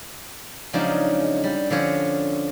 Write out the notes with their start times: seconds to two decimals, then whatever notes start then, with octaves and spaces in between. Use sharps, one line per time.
0.73 C#3 F3 F#3 G#3 D4 D#4
1.44 G3
1.70 D3 F3 C#4 C#5